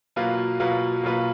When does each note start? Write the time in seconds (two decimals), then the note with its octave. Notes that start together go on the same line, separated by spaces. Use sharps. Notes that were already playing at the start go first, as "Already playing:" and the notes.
0.16 B2 F#3 A#3 F4 B4
0.60 B2 F#3 A#3 F4 B4
1.03 B2 F#3 A#3 F4 B4